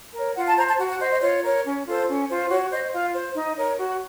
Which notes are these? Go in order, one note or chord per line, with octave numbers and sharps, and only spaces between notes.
A#4 C#5
F4 F#5
A5
C5 A#5
A5
F#4 F#5
F#5
C5 D#5
D#5
F4 C#5
A#4 C#5
C#4
F4 A4 C5
C#4
F4 C5
F#4 C#5
C5 D#5
F4 F5
C5
D#4
A#4 C#5
F#4